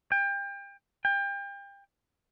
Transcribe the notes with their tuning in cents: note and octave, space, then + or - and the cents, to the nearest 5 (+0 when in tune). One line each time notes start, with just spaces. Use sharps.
G5 +30
G5 +30